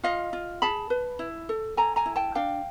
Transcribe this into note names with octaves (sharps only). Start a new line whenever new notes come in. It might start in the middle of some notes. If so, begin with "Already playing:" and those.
F4 D#5 F5
F4
G#4 A5 B5
B4
E4
A4
A4 G#5 A#5
G#5 A#5
E4
G5 A5
D4 F5 G5